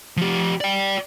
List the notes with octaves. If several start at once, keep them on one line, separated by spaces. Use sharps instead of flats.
F3 G4
D5 G5